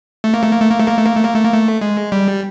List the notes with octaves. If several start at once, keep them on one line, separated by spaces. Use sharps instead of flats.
A3
A#3
A3
A#3
A3
A#3
A3
A#3
A3
A#3
A3
A#3
A3
A#3
A3
G#3
G3